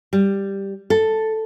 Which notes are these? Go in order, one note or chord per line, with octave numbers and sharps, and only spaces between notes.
G3
A4